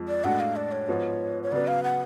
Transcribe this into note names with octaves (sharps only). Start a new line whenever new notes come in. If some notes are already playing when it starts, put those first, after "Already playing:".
Already playing: F2 F3 G#3
D5
A2 G#3 D4 F#4 A4 F#5
F5
D5
C#5
G#2 F3 B3 F#4
C#5
C#3 F#3 B3 D5
F5
F#5